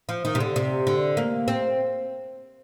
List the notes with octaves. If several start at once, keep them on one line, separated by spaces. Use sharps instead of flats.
F3
D#3
C3
D3
C3
D3
A#3
C4